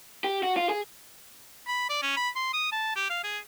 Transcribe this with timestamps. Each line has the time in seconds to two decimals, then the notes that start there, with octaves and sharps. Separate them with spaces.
0.24 G4
0.43 F#4
0.57 F4
0.69 G#4
1.67 B5
1.89 D5
2.02 C#4
2.16 B5
2.35 C6
2.53 D#6
2.72 A5
2.96 G4
3.10 F5
3.23 G#4